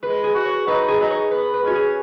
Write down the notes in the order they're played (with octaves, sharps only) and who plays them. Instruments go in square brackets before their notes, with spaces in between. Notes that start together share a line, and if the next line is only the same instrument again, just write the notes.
[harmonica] G#3 [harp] B4
[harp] G#4
[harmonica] F#4
[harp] C#5
[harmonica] F#3 B3 D#4 [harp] B4
[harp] G#4
[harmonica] F#3 B3 D#4
[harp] C#5
[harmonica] B3 [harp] B4
[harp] B4
[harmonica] G#3 C#4 [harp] F#4
[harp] G#4